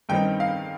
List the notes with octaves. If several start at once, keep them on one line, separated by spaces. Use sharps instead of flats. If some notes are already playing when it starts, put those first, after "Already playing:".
G2 D#3 G3 C4 D#4 G5
F5